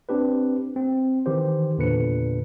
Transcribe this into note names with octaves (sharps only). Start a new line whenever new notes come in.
C4 D4 G4 B4
C4
D#3 E3 G4 C5
E2 A#2 D3 D4 B4 C#7